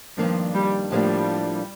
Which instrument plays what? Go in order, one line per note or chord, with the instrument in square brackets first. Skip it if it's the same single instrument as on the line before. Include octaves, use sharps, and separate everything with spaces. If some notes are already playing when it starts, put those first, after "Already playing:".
[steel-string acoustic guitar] G2 D#3 A#3 D4 [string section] F3
[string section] G3
[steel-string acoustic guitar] A2 F3 A#3 D4 [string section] G3